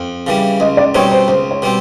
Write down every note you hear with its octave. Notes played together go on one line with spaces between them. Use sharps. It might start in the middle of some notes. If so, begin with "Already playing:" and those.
Already playing: F2
C#3 E3 G3
C#2 D#5
D5
B2 G3 C4 D#4 C#5
C5
C#2 C5
C#5
B2 G3 C4